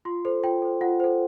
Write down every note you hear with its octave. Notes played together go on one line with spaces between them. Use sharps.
F4 C6
A4 C5
F4 G5
A4 C5
F4 F#5
A4 C5